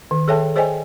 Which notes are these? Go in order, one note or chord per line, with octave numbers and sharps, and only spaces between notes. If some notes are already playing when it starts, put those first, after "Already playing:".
D#3
G#4 A4 C#5 E5 G5 A5
G#4 C5 D5 D#5 G5 G#5